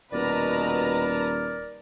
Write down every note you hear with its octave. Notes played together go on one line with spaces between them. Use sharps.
D#1 B2 A#4 B4 D5 A5 A#5